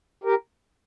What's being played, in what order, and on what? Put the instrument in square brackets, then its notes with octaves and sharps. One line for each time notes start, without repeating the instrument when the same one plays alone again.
[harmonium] G4 A#4